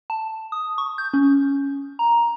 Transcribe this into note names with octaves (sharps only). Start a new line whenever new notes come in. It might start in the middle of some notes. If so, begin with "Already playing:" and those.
A5
D#6
C#6
G6
C#4
A#5